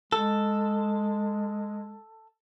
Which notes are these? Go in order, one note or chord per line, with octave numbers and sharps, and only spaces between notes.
G#3 A4